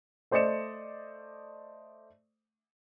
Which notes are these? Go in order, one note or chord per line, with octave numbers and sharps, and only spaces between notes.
A3 C5 D5 D#5 C#7 E7